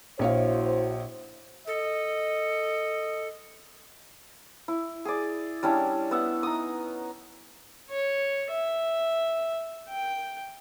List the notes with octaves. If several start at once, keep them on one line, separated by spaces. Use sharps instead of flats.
A#1 E4 F#4 C5 C#5 F5
A4 D#5
E4
G#4 D5
G3 C#4 D4 E4
B3 E5 F#5
D#4 D#6
C#5
E5
G5